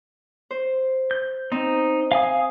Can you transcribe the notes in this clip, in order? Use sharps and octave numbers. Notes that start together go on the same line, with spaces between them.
C5
G6
C4 D#4
F5 G#5 D#6